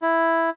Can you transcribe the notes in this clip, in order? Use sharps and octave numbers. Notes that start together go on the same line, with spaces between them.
E4